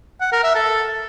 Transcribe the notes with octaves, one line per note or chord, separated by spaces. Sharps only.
F#5
A#4
E5
A4